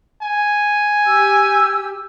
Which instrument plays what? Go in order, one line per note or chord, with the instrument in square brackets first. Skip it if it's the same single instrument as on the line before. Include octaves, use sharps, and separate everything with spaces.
[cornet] G#5
[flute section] G4 E6